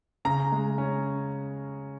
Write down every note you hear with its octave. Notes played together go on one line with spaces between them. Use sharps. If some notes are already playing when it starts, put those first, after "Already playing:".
C#3 A#5
G#3
C#4